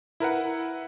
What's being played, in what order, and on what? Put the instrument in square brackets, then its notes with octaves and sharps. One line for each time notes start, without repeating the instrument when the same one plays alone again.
[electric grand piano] E4 A#4 B4 F#5